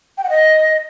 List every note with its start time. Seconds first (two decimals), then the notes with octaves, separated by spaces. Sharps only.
0.18 G5
0.24 F#5
0.30 D#5